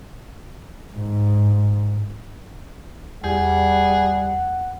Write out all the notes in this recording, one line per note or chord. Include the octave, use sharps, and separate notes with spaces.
G#2
E2 G3 G#4 F#5